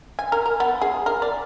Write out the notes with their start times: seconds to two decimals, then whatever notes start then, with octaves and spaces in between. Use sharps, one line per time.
0.19 G#5
0.32 A#4
0.46 A#4
0.60 B3
0.81 G#4
1.06 A#4
1.22 D5